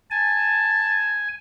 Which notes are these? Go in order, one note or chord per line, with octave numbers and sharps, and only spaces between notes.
G#5 A5